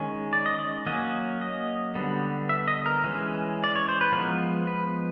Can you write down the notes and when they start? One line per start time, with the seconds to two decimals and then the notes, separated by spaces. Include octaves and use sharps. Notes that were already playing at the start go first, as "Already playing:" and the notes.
Already playing: D#3 G#3 C#4
0.33 D5
0.46 D#5
0.59 D5
0.87 F#3 A#3 C#4 D#5
1.41 D#5
1.95 D3 G3 B3
2.49 E5
2.68 D#5
2.86 A#4
3.04 E3 G#3 C#4
3.64 D5
3.76 C#5
3.89 C5
4.01 B4
4.12 F3 G#3 B3 A#4
4.67 B4